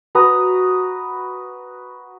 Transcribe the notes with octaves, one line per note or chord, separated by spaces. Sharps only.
F#4 B4 A#5 D#6